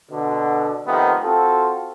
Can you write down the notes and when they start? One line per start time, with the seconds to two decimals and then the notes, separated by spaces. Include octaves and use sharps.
0.11 B2 D3
0.86 C3 D#3 F3 A3 B3
1.23 C4 F4 F#4 A4